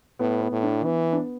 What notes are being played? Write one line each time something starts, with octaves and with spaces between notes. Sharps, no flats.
A2 B3
B3
A2
D4
E3 B3
D4
B3